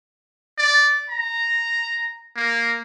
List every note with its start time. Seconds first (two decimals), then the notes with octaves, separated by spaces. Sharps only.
0.58 D5
1.10 A#5
2.36 A#3